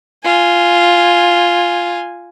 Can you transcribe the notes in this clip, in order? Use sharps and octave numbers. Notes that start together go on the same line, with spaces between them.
F4 G#5